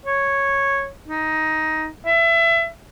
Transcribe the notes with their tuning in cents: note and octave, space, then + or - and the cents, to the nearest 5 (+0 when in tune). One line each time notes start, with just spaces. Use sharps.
C#5 -5
D#4 +10
E5 +25